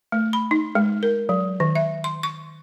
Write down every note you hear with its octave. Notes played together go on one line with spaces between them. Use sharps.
A3
B5
D#4
G#3
A#4
F#3
D#3
E5
C6
C#6